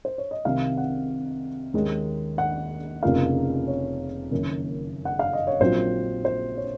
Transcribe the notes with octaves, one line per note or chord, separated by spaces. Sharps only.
C5
C#5
D#5
C2 C3 D#3 F5
F#5
D#2 D#3 G#3 C#4
F#5
F1 F2 C#3 F3 A#3 F5
C#5
F#1 F#2 D#3 A#3 C#4
F#5
F5
D#5
C#5
A#1 A#2 F#3 C4 F4 C5
C5
C#5